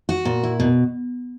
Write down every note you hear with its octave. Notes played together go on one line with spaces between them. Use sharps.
F#4
A#2
E4
B2